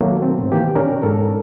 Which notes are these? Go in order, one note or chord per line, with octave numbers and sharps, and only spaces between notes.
B2 D#3 F#3 A3 A#3
C4
G#2 B2
D#3 E3 A#3 G4
B2 C#4 D4 A#4
G#2 A4 A#4